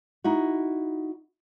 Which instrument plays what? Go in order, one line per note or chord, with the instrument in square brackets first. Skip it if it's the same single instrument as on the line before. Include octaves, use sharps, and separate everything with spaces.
[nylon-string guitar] D#4 E4 F#4